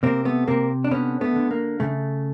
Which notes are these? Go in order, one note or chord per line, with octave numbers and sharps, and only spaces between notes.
C3 A#3 C4
A3 B3
C3 A#3 C4
D4
D3 B3 C#4
A3 B3
D3
A#3
C#3 A3